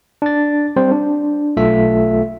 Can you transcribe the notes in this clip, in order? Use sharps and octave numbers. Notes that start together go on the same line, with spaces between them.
D4 A6
G3 C4 C5
D4
B1 A3 F4 A4 E5 B6